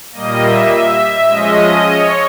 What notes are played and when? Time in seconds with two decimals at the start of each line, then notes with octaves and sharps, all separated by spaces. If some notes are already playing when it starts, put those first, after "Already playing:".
0.12 A#2 G3 A#3 D#5
0.42 E5
0.71 E5
1.27 F3 G#3 C#4 D#5
1.86 C#5